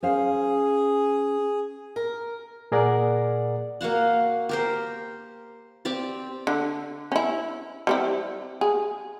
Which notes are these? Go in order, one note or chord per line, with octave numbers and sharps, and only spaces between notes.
C#4 G#4 C5 F5
A#4
A#2 G#4 A#4 D5 F#5
A#3 F#4 F5 F#5
G4 A#4 C5
C4 G4 D5
D3
C#4 E4
G3 C4 E4
G#4